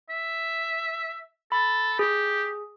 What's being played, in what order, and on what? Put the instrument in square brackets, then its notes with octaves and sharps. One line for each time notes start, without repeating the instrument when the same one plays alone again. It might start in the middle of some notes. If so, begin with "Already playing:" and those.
[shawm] E5
[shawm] A4 [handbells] B5
[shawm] G4 [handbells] G#4